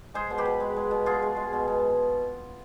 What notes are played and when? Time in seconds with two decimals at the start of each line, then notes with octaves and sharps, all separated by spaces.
0.14 G#3 G#4 C5
0.30 B2
0.38 G4 B4
0.45 B2
0.60 G#3
0.76 G#3
0.91 B2
1.06 B2 F4 G#4
1.22 G#3
1.36 G#3
1.53 B2
1.68 B2